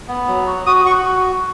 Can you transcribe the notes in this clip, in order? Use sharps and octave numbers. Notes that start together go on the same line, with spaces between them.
B3
F#3
F#4
F#4 D#6
F#4 C#6